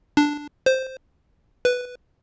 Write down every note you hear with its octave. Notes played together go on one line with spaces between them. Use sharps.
D4
C5
B4